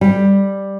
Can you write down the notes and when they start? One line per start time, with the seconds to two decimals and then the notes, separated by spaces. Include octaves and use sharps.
0.01 G3